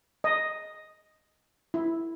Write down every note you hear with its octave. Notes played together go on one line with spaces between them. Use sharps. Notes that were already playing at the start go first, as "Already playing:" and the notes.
D#5
E4